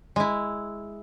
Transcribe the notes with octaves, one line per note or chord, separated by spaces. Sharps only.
G#3 E4